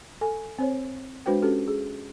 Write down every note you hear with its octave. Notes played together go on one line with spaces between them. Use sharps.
A4 G#5
C4 C5 C#5
G#3 D4 F#4 B4 C5 G5
C#4 F#4 G4 A4
G#4